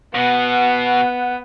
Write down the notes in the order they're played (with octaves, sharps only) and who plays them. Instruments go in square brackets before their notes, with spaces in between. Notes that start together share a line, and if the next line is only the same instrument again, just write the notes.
[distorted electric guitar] B2 [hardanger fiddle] B3 [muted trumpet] F#5